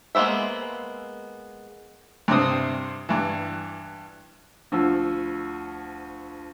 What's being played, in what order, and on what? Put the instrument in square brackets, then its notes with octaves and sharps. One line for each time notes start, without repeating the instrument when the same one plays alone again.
[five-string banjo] G#3 A#3 B3 C5 E5
[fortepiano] G2 C3 C4 D#6
G2 E3
[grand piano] D2 F3 E6